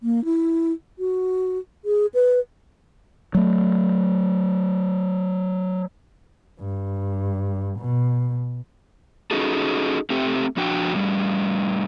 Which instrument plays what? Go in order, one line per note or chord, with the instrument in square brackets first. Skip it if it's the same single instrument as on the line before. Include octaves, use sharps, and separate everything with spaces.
[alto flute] A#3
E4
F#4
G#4
B4
[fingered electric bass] F#3 A3
[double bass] G2
B2
[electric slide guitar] C#4 D#4 F#4 G#4 A4
A3 C4 G4
F3 D4 F#4 G5
A2 G3